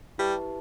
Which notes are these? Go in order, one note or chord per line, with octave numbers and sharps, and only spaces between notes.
G3 E4 G4 B4 E5 A5